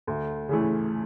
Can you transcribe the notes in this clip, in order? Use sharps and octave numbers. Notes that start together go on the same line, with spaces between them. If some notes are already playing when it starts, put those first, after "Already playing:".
D2
C#3 E3 A3